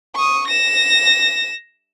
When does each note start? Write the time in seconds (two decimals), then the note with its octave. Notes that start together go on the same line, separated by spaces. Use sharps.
0.15 C#6 D#6
0.48 A#6 E7